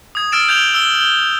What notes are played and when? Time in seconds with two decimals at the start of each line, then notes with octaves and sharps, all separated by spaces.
0.15 D#6 G#6
0.32 E6 F6 A6 D7 E7
0.48 G6 G#6 F7 G7
0.74 E6 G7
1.01 G7